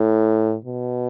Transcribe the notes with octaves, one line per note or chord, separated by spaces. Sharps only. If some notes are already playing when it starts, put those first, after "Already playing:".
Already playing: A2
B2